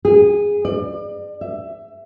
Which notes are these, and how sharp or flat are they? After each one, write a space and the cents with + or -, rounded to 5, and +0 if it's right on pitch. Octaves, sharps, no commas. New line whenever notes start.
G#4 -15
D5 +35
E5 +20